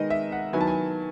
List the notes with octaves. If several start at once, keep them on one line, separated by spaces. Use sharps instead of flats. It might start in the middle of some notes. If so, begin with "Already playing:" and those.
Already playing: D#3 G#3 B3 D#4 D#5
E5
F#5
D#3 F#3 B3 E4 G#5
A5
G#5